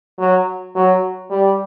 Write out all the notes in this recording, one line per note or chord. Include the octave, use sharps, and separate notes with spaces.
F#3
F#3
G3